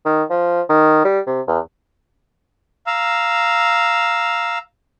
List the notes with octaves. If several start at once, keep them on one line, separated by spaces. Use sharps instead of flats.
D#3
F3
D#3
G3
C3
E2
F5 A#5 E6